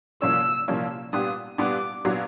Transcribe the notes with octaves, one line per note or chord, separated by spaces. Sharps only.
C2 A#2 F3 A#3 C#4 E6
C2 A#2 F3 A#3 C#4
A#2 G3 B3 D4 G4 D#6
A#2 G3 B3 D4 G4 D6
A#2 F#3 B3 D4